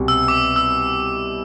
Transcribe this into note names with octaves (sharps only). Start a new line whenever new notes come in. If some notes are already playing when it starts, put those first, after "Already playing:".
Already playing: C2 B2 G3 B3
E6
D6
E6